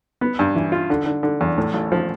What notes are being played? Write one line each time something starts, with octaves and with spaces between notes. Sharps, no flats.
B3
G2
E3
F4
D3
D3
D3
E2
A2
A1
F3